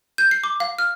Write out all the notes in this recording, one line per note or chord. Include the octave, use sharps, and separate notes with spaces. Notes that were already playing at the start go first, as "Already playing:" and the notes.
G6
C7
D6
F5
F6